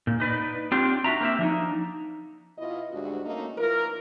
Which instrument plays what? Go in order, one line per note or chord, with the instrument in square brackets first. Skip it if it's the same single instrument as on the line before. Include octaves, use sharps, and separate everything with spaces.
[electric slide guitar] A#2
D#4 B4 D5
C4 D4 F4 G4
D4 F#4 E5 A#5
A#3 C4 E5
F3 D4 D#4
[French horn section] B2 E4 F4 D#5
D2 G#2 G3 D4 F#4
A3 A#3 C#4 D#4
E3 F4 A#4